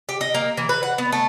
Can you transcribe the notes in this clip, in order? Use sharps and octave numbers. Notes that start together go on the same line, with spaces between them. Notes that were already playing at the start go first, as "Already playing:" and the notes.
G4
D#5
A#3
E3
B4
F#5
B3
A3